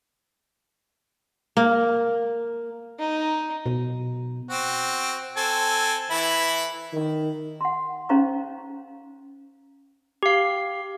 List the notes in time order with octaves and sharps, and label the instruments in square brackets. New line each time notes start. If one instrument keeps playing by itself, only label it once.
[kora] A#3
[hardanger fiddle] D#4
[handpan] B2
[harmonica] C4 F#4
C4 A4 G#5
E3 E4 B5
[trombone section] D#3
[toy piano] F#5 C6
C#4 D#4 C5 F5 A#5 C#6
[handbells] G4 F5